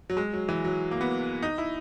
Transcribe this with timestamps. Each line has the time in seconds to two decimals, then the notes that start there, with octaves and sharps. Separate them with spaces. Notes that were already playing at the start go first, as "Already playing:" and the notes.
0.10 F#3
0.17 G#3
0.33 F#3
0.49 E3
0.65 F#3
0.91 A#3
1.01 B3
1.43 D#4
1.58 E4